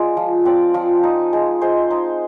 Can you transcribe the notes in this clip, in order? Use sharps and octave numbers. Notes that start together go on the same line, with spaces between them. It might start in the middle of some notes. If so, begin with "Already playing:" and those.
Already playing: G#3 F4 D5
F3
C4 D5
F3
D#4
G#3
G#3 C5
D#4